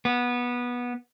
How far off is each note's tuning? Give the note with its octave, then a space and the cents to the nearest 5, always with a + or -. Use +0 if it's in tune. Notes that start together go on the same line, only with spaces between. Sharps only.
B3 -15